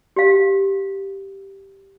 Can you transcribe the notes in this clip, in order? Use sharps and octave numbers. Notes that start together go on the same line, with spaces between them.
G4 F5